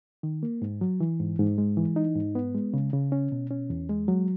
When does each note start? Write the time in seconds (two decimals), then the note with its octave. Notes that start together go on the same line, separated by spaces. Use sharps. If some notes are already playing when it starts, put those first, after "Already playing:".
0.23 D#3
0.43 A#3
0.62 G#2
0.81 F#3
1.00 E3
1.19 G#2
1.39 G#2
1.58 G#3
1.77 E3
1.96 D#4
2.15 G#2
2.35 B3
2.55 G#3
2.74 C#3
2.93 C#3
3.12 C#4
3.32 B2
3.51 C#4
3.70 E2
3.89 G#3
4.08 F#3